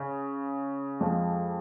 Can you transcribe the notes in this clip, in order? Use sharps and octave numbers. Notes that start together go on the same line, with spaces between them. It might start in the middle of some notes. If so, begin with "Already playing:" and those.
Already playing: C#3
F2 F3 G#3